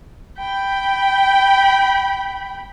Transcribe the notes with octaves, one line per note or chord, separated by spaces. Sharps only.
G5 B5